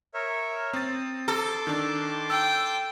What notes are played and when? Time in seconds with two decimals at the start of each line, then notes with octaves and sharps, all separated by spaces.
0.14 A#4 C#5 E5
0.73 C4 D#6 A6
1.28 A4 A5 C6 D6
1.67 D#3 D4
2.30 G5 E6